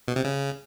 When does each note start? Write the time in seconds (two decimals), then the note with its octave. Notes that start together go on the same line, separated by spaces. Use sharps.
0.08 B2
0.16 C3
0.25 C#3